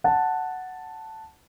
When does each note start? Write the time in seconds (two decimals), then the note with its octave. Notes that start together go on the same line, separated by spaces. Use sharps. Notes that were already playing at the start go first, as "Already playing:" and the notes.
0.04 F#5 A5